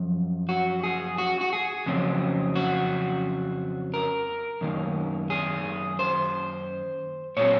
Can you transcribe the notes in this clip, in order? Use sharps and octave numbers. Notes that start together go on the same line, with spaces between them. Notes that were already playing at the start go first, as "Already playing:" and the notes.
Already playing: F#2 F3
F#4
G#4
F#4
F#4
G#4
F2 C#3 F#3 C4
F#4
A#4
F#2 D#3 A#3 C#4
G#4
C5
A#2 F#3 C4 C#5